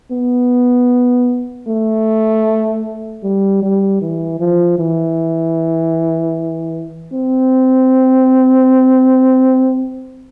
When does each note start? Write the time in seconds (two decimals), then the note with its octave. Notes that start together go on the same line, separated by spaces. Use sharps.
0.11 B3
1.67 A3
3.23 G3
3.62 G3
4.01 E3
4.39 F3
4.79 E3
7.12 C4